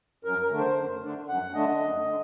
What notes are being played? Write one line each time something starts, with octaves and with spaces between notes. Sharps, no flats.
F#2 A#4
A#4
D3 A3 D4
C5
F#2
D3 A3 D4
F#2 F#5
D3 A3 D4 D#5
F#2
D3